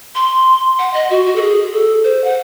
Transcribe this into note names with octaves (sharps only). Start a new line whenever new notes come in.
C6
F#5
D#5
F#4
F#4
A4
G#4
G#4
A4
C5
F#5